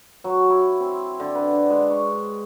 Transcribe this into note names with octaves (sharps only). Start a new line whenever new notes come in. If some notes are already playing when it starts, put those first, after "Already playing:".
F#3
E4
C4
D3
B4
D4
G#3
C#6